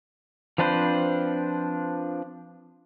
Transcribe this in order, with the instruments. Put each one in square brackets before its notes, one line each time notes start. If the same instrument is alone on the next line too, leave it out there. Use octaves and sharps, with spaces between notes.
[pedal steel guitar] F3 C4 D4 B4 C5